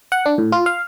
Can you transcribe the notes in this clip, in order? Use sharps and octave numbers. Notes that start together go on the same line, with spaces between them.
F#5
D4
A2
F4
F5